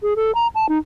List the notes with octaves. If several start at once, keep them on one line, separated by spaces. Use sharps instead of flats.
G#4
A4
A#5
A5
D#4